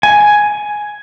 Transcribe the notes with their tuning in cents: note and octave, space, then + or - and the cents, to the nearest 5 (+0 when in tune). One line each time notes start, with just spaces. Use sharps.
G#5 +5